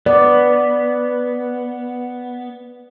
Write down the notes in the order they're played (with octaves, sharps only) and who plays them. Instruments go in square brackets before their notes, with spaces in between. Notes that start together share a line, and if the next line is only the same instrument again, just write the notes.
[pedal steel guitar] B3 [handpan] D5